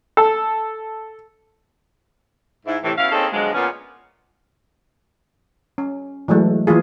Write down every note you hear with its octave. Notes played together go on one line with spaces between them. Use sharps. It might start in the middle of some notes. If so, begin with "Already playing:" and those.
A4
G#2 E4
A2 C3 E3
B2 C#4 E4 F5
A#3 C4 C#4 D#4 G#4 A4
B2 D3 F3 F#3 G#3
A#2 B3 C#4
C#4
E3 F#3 G#3 A3
E3 A#3 F4 G#4